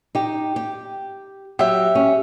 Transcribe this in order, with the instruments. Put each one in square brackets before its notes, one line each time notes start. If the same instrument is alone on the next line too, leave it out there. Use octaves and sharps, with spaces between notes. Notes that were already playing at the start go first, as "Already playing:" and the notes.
[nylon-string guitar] D#4 G4
G4
[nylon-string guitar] F#3 [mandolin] G4 E5
[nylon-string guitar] C#4